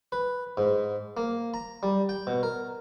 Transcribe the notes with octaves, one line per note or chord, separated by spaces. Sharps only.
B4
G#2
A#3
A#5
G3
G5
B2
A#4